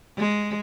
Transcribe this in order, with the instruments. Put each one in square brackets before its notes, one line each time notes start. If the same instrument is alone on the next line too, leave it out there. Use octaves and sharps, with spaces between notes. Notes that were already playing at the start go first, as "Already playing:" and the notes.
[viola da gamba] G#3